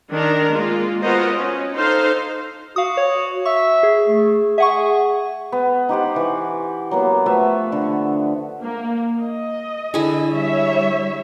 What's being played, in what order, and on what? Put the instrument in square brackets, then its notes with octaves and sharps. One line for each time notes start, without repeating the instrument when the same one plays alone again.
[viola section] D#3 D4 A#4
G#3 A#3 F4
B3 F4 F#4 A#4 C5 D#5
C#4
D#4 A4 C5 F5
[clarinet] F#4 [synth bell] F5 D#6
[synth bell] C#5
[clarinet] E5 [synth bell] C#6
[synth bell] G#4
[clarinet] A3
[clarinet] G#4 [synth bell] E5 F#5 C#6
[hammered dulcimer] B3
D#4 G4 C5 F#5
E3 C#6
F#3 A#3 B3
F3 A3 B3 E5
D3
[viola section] A#3
D#5
[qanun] D3 E4 G#4
[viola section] G3 C#5 E5